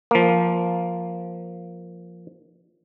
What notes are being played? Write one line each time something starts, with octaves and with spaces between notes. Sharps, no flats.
F3 A#3